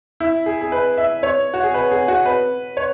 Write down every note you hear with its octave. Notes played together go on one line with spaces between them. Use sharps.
E4
G#4
G#4
B4
E5
C#5
F#4
G#4
B4
G#4
F#4
B4
C#5